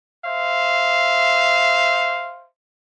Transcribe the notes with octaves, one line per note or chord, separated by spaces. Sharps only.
C5 E5 F5